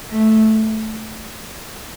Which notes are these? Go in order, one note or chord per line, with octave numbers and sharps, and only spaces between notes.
A3